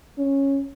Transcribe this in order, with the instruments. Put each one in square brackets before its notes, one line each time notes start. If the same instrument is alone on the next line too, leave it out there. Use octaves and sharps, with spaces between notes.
[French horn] C#4